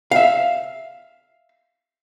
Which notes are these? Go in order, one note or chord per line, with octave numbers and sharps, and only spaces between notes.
E5 F5